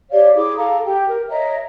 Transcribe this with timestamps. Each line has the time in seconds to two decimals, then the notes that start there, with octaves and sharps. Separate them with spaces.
0.10 G4 C#5 D5 F5
0.35 E4 G#4 D6
0.57 A4 F5 A#5
0.85 G4 G5
1.08 A#4
1.30 C#5 D#5 E5 A#5